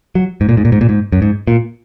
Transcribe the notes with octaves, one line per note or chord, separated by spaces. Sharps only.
F#3
G#2
A#2
G#2
A#2
G#2
A#2
G#2
F#2
G#2
A#2